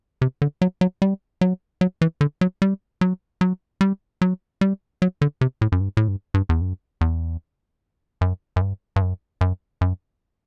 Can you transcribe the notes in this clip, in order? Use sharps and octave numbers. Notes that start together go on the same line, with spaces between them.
C3
D3
F#3
F#3
G3
F#3
F#3
E3
D3
F#3
G3
F#3
F#3
G3
F#3
G3
F#3
D3
C3
A2
F#2
G2
A2
G2
G2
E2
F#2
E2
F#2
F#2
G2
G2
F#2
F#2
F#2